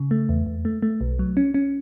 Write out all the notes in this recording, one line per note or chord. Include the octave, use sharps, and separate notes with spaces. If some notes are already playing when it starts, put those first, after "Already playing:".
Already playing: C#3
A3
E2
E2
A3
A3
B1
F#3
C#4
C#4